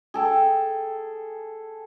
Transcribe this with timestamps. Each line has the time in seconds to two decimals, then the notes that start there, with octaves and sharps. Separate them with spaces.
0.14 G#4 A4 G5